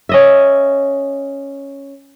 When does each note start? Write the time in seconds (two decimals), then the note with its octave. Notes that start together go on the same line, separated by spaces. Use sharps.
0.09 C#4 D#5 E5